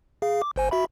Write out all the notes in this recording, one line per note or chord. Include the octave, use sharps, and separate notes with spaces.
G#4 F5
D6
G1 C5 G#5
F#4 E5 B5